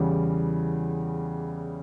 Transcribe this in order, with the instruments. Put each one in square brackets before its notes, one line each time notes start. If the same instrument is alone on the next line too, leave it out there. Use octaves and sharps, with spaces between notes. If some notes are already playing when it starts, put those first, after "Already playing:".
Already playing: [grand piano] E2 C#3 E3 G3